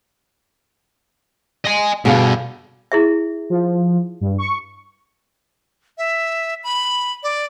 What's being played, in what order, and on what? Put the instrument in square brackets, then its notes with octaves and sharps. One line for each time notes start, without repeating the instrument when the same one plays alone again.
[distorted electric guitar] D#5 G#5
[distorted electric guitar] G2 D3 [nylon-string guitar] B2 G#4 F5
[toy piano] E4 G#4 E5
[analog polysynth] F3
G2
C#6
[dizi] E5
B5
D5